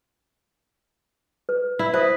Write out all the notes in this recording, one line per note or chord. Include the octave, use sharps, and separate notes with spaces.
B4
E4
B4 C5 E5 D#6